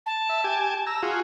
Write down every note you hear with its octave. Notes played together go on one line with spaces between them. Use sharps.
A5
E5
G4 G#5
A#5 E6
F4 F#4 G#4